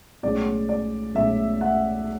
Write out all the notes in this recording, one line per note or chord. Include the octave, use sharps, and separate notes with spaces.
B1 A2 G#3 C#4 D5
D5
B1 A2 G#3 C#4 E5
F#5